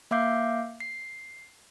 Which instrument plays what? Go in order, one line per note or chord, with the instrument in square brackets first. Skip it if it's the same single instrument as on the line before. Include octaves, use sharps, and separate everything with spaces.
[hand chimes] A#3 E5 F5 D6 G6 C7
C7